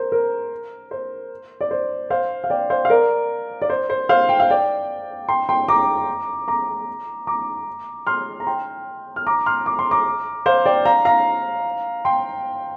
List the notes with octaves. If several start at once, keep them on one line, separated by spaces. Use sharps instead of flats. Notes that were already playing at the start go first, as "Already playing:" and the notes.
Already playing: A#4 C5
A#4
C5
D5
C5
C5 F5
F5
D5 G5
C5 F5
F5
A#4 D5
D5
C5
C5
C5 F5
G5
F5
D5 G5
G5 C6
G5 C6
A#5 D6
A#5 D6
A#5 D6
C6 F6
A#5
G5 C6
F6
A#5 D6
C6 F6
D6
C6
A#5 D6
C5 F5
D5 G5
F5 A#5
F5 A#5
G5 C6